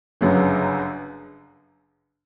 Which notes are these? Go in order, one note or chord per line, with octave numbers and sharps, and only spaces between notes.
G1 F#2 C#3 F#3